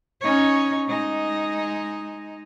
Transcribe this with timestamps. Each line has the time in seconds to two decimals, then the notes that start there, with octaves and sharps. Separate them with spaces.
0.21 C#4 D#4 C#5
0.87 G#3 D#4